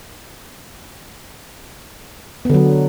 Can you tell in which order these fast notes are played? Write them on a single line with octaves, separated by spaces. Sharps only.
B3 D3 F#3